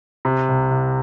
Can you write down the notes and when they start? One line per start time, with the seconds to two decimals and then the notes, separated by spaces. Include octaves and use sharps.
0.25 C3
0.49 C2
0.71 C2